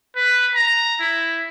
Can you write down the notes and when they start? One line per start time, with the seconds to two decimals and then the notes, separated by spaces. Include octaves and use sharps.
0.16 B4
0.56 A#5
1.01 E4